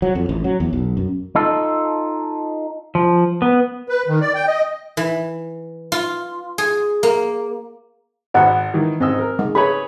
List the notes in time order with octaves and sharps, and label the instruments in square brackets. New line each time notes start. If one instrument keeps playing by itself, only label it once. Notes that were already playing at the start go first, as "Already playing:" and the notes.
[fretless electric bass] F#3
F2
A1
F#3
E2
B1
F#2
[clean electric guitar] D#4 F4 A4
[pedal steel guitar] F3
B3
[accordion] B4
D#3
D5
G5
D#5
[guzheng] E3
F4
G#4
A#3
[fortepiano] G#1 B5 [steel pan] D#5 F#5
[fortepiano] D#3 E3
[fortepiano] G#2 D#5 E6 [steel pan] C4
[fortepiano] A#4
[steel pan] G#3
[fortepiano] G#4 B4 C#5 [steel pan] B5